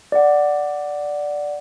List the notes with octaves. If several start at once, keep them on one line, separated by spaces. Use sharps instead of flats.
D5 F#5